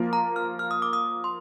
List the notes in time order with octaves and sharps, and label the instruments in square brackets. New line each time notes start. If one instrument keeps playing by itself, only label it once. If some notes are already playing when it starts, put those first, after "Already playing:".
Already playing: [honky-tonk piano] F3 A#3 F4 A#4
[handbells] A#5
F6
F6
D#6
D6
D#6
C6